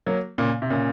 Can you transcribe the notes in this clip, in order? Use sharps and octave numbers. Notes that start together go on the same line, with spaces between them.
F#3 A#3
A#2 C#3
C3
A#2 C#3